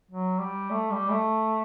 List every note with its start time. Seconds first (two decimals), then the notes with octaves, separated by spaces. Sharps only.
0.11 F#3
0.40 G3
0.70 A3
0.91 G3
1.10 A3